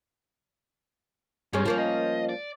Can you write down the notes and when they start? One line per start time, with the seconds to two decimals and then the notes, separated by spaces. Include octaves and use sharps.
1.53 G2 F#3 G#3 C4 C#4
1.65 F3 A#3 C#4 C5
1.78 D#5
2.29 D5